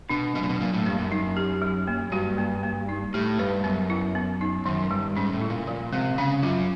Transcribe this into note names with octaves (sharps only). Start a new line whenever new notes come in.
B2 D4
B2 F#3
A#2
B2
A#2 F#3
A2
G2 A#3
F#2
D#4
G4
F#3
A#3
G2 F#4
A#3
A#3
D#4
A2 G4
G2 B4
F#2 B3
E4
B3
D#4
F#2 D#3
G2 G3
G#2 C#4
A2
E4
A#2
A#2 F3
C3 G#3
C#3 C#4
F#2 F#3 F4